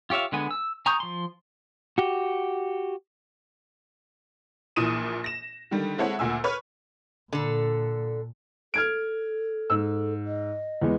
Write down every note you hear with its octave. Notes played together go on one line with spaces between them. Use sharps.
F4 G4 C#5 E5 F5
D3 G#3 B3 G#5
E6
G#5 A#5 C#6 D#6 G6
F3 C6
F#4 G4
A#1 A#2 E3 D#6 D#7 E7
A#6 E7
D3 D#3 G3
G#3 C4 E4 A4 C#5 F#5
D2 A#2 G#5 E6
B4 C#5 B5 C#6 F6
A#2 D3 A4
A4 F6 G#6 D7
G#2 E6
D#5
E2 G#3 B3